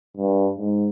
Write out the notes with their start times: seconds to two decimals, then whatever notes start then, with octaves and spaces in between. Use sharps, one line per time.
0.17 G2
0.58 G#2